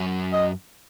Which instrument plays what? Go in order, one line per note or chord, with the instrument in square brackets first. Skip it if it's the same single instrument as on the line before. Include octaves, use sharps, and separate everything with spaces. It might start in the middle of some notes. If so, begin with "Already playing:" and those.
Already playing: [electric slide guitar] F#2 F#3
[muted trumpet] D#5